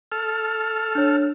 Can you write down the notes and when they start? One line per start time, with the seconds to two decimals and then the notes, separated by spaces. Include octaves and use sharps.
0.12 A4 F6
0.95 D4 C#5